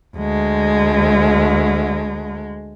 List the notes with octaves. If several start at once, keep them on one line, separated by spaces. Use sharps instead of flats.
D2 G#3